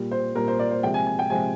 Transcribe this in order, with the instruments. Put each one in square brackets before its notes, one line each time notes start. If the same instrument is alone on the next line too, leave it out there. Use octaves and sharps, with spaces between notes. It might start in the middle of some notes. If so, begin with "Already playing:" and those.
Already playing: [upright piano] A#2 G3
C5
A#2 G3 A#4
C5
D5
C5
C3 F3 G#3 G5
G#5
G#5
G5
C3 F3 G#3 G#5